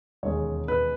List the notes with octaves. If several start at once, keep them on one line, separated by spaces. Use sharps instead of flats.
E1 D#2 D#3 G#3 C#4 C#5
B4